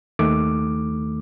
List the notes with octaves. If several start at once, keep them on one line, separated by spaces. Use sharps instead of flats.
D#2 D#3 A3 D6